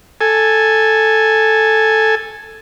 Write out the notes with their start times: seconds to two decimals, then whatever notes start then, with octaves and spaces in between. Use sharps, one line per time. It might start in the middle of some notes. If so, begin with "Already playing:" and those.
0.21 A4 G#5